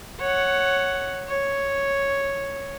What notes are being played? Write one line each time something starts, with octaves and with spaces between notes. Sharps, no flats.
C#5 F#5
C#5